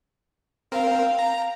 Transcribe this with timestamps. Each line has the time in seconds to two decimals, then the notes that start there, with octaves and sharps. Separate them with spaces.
0.72 C4 A#4 F5 G5
1.19 A#5